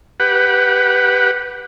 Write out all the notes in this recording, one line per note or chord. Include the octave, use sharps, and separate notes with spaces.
G4 B4 F#5